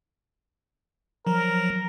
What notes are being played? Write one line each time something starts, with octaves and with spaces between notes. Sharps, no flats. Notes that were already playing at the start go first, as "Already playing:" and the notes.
F3 F#3 A#4